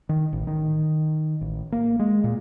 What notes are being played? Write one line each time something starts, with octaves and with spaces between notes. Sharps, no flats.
D#3
A1
D#3
A1
A#3
G#3
A#2